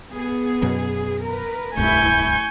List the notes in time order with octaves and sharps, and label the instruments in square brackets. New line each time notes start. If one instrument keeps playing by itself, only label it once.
[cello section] B3 G#4
[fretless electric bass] F#2 B2 F#3
[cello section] A#4 B4
[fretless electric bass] D1 C2 G2 [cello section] A3 E4 [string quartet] G#5 C#6 G6